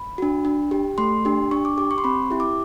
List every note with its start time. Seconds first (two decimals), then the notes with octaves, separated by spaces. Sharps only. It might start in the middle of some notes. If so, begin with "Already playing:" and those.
Already playing: B5
0.18 D4 F#4
0.45 D4
0.71 G4
0.98 A3 C6
1.25 D4 G4
1.51 D4 C#6
1.65 D6
1.78 G4 D6
1.91 C#6
1.98 C6
2.04 C4 B5
2.31 E4 G4
2.40 D6